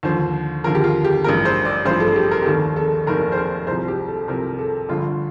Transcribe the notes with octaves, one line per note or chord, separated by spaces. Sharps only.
D#2 D3 F3 C5
D#2 D3 F3 A#4
G4
F4
G4
A1 G2 F3 A#4
C5
D5
A1 G2 F3 C5
A4
G4
A#4
G4
F1 D#2 D#3 A4
A4
F1 D#2 D#3 A#4
C5
A#4
C2 C3 F3 C5
G4
A4
C2 C3 F3 A#4
A4
G1 G2 D3 F3 F4